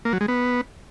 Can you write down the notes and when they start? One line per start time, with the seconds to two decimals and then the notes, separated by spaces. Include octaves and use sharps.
0.05 A#3
0.13 F#3
0.21 G#3
0.28 B3